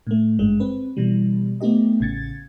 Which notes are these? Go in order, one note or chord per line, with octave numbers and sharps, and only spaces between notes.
A2 A3
G#1 G2 G#3
C4 B4
B2 E3 G3
A3 B3 D#4 G4 D#5
A1 C#3 G#6 A6 C#7